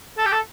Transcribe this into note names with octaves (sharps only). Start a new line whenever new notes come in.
A4
G4
A4